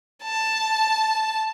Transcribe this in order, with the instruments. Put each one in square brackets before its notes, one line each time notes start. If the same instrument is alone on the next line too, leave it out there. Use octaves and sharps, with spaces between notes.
[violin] A5